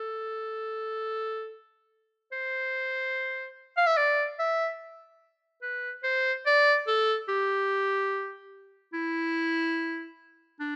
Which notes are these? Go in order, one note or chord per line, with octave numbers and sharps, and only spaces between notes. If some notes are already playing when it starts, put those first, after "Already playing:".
Already playing: A4
C5
F5
E5
D5
E5
B4
C5
D5
A4
G4
E4
D4